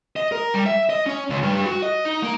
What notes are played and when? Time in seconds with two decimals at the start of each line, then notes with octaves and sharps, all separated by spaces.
0.16 D#5
0.32 A#4
0.54 G3
0.66 E5
0.90 D#5
1.06 C#4
1.30 C#2
1.43 G2
1.66 F#4
1.82 D#5
2.05 D#4
2.23 A#3